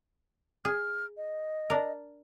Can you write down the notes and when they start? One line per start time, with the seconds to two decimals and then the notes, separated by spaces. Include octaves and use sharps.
0.65 G#4 F6
1.17 D#5
1.70 D4 A#4